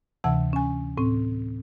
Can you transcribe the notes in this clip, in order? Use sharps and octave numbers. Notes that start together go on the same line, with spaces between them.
D2 C3 E3 F#5 A5 E6
C#4 G#5
A2 C4